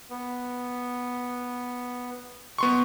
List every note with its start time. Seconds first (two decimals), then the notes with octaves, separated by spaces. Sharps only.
0.10 B3
2.58 B3 C6 C#6